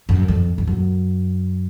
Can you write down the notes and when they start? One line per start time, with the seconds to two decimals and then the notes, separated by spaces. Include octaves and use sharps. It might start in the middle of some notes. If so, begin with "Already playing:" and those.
0.09 F#2
0.28 F2
0.58 F2
0.67 F#2